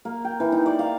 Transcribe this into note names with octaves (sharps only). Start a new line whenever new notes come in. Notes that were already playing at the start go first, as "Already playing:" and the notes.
A#3
G5
E3
D#4
D5
F5